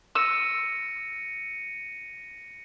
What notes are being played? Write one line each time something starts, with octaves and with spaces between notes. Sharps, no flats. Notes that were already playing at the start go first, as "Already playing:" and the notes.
E6 A#6 C#7 D#7